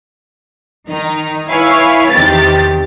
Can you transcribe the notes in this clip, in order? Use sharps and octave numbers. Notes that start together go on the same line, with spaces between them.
D#3 D#4
E4 B4 C#5 E5 F5 G#5
E2 C3 D#3 G4 A6